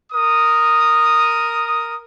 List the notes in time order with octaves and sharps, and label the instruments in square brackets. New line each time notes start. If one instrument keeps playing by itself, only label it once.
[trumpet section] A#4 D#6